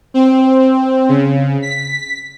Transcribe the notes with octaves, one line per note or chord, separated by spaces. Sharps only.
C4
C#3
B6